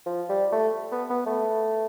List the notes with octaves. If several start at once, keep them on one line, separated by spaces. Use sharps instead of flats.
F3
G3
A3
B3
B3
A3